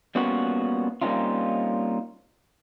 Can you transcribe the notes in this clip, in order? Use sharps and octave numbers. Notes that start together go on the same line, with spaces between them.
G3 A#3 B3 C#4 F4 F#4
G3 A#3 C4 C#4 D#4 F4